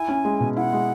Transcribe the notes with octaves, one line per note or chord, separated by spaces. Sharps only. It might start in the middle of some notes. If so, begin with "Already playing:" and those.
Already playing: E4 G#5
C#4
G#3
B2
E4 F#5
G#3